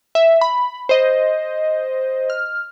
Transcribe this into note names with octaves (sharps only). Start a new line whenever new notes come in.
E5
B5
C5 D#5
F6